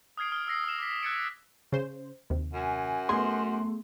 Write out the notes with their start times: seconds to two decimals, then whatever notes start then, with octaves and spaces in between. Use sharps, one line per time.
0.17 D#6 F6 G#6 C7 D7
0.32 D#6 F6 D7 G7
0.47 E6 F6 A#6 C7
0.64 D#6 F6 E7
0.78 D6 B6
1.03 E6 F#6 G#6 A6 C#7 D7
1.72 C#3 C5
2.30 D#2 C3
2.53 F#2 G#5
3.09 A3 B3 G#4 C6